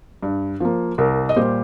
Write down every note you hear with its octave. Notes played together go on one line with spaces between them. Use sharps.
G2
F3 A#3
C2 A#4
D#5
A#2 G3 G4 C5